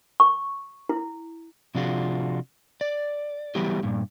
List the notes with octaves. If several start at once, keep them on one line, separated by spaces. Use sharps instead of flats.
C#6
E4
C3 F3 D4 F4 F#4 G#4
D5
E3 F#3 G3 B3 E4 G4
G2 A#2